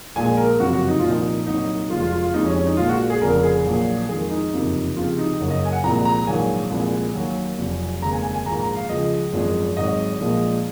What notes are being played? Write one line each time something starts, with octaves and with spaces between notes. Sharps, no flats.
A#1 A#2 G#3 G#5
A#4
F#1 F2 C3 F#3 F#4
F#4
D#4
C2 A#2 F3 F4
D#4
C2 A#2 F#3 D#4
F1 F2 C3 F3 G#3 F4
F4
F4
F4
F1 F2 C3 F3 G#3 D#4
C#4
C#4
D#4
A#1 A#2 F3 G#3 F4
F#4
G#4
F1 F2 C#3 A#4
G#4
A#1 A#2 F#3
F2 D#3 G#3 G#4
D#4
F#1 F2 C3
C#2 C3 F3 G#3 F4
D#4
F#1 F#2 C#3 F#3
D#5
G#5
F#5
C2 A#2 F3 G#3 A#5
A#5
A#1 G#2 D#3 F#3 G#5
C2 A#2 F3 G#3
D#2 D#3 F#3
F1 F2 C3 F#3
F1 D#2 C#3 G#3 A#5
G#5
G#5
G#5
A#1 G#2 D#3 A#5
A#5
F5
C#2 C#3 F3 G#3 D#5
G#1 F#2 F3 G#3
G#1 G#2 F#3 D#5
A#1 A#2 F3 G#3